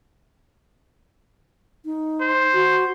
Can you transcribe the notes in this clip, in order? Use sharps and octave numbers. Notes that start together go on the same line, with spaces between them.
D#4
C5
F#4